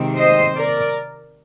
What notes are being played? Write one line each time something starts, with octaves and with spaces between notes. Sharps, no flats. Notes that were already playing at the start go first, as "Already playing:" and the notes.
Already playing: C3 D#3 G#3 C4
C5 D#5
A#4 D5